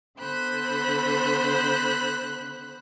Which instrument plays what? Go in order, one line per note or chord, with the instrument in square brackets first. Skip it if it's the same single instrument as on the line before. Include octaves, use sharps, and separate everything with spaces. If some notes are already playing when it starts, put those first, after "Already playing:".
[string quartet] D3 B3 C5 B5 F#6